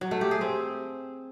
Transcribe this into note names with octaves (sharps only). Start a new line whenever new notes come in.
F#3
A3
G4
G#4
C4